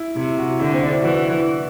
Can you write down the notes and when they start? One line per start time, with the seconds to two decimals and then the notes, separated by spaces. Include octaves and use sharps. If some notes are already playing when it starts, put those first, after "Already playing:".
Already playing: E4
0.16 C3 E4
0.38 F#4
0.59 D3 E4
0.74 C4
0.83 D4
0.93 E4
1.02 E3 F#4